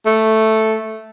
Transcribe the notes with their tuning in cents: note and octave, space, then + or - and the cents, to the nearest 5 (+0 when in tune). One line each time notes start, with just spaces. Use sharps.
A3 +0